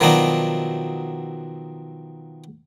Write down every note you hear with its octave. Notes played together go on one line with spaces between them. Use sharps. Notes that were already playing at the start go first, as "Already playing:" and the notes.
B2 D#3 F3 F#3 D4 D#4